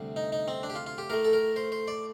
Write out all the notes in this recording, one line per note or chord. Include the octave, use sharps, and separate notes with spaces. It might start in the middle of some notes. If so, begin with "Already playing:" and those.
Already playing: D2 C3 G3
D#4
D#4
C4
D4
G4
F4
F4
G4
A2 A3 A#4
A4
A#4
C5
C5
D5